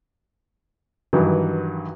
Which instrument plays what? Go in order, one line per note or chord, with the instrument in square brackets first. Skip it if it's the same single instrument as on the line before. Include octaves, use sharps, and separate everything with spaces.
[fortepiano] G2 D#3 E3 F#3